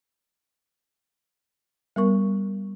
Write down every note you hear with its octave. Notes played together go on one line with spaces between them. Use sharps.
G3 B3 A#4 C#6